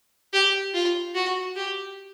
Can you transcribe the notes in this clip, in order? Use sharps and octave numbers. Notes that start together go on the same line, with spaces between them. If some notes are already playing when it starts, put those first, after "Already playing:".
G4
F4
F#4
G4